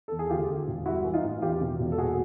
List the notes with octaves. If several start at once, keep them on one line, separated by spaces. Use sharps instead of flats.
E2 A4
G#4
D2 F4 G4
D3
E1
G2 E4 F#4
E3
D#4 F4
A1
E2 F4 G4
B2
E1
A4
A#2 F#4 G#4